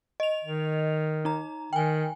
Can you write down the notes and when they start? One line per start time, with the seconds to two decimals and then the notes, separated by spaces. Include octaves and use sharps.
0.20 D#5 F7
0.44 D#3
1.25 D#4 A#5
1.73 D#3 G5 G#5